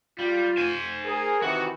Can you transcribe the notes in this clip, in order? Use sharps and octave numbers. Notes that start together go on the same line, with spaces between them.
G3 F4
C5 G#5
G#4 A#4
C3 D#3 E3 F#4